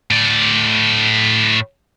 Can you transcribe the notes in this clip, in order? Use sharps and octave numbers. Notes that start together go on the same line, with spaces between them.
A2 D5